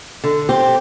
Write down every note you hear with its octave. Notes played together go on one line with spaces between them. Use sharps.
D3
C4 G4